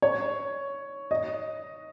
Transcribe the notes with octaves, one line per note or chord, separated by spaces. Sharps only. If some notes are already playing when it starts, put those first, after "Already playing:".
C#5
D#5